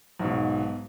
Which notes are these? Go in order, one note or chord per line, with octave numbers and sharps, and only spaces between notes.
B1 G#2 B2